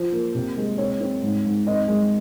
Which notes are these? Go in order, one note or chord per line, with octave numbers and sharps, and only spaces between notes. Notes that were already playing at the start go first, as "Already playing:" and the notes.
Already playing: F3 C5
A#3
C3
G#3
C4 C#5
C4
G#2
G#2
C4 D#5
G#3